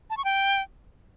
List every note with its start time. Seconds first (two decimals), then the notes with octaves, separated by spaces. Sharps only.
0.10 A5
0.17 C#6
0.25 G5